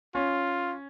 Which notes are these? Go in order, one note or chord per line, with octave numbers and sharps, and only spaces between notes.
C#4 F4